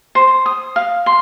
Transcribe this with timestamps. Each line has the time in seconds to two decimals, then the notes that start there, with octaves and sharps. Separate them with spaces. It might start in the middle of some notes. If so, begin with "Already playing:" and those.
0.15 C5
0.46 D#6
0.76 F5
1.06 C6